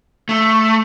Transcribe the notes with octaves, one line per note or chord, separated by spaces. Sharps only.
A3